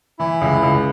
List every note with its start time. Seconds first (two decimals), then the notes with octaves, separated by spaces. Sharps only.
0.19 E3 E4
0.41 C#2
0.63 C#2